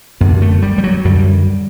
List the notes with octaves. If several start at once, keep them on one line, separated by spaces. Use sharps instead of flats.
F#2 D3 B3
A3
G3
G3
F#3
F#2 D3 G3